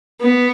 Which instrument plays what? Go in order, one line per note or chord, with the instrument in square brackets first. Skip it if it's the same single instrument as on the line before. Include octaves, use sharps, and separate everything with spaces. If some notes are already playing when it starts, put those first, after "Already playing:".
[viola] B3